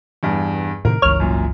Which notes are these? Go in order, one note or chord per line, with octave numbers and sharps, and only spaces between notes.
E2 G2
A2 C3 D#3 A#4
G1 C#2 E3 C#5 F6
F#2 A#2